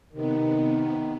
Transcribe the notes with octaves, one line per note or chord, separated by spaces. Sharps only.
C3 D#3 B3